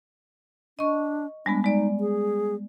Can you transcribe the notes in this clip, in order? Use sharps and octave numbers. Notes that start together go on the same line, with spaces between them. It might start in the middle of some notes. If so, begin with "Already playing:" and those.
D4 D#5 C#6
G3 G#3 B3 D4
G#3 D#4 D5
G#4